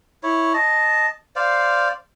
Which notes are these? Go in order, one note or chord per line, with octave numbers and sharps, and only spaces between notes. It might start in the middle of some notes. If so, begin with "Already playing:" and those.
E4 C#5
D#5 A5
C5 D5 F5